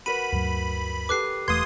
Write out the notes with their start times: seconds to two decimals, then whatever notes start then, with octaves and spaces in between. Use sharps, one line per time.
0.06 F#4 A#4 B4 B5 D#7
0.32 D2 G2 F#3
1.09 G4 A4 B4 D6 F#6 C7
1.48 E1 E2 A3 B4 F5 C6 D#6 G#6